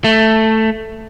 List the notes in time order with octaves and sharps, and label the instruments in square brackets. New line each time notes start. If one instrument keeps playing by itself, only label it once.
[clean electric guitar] A3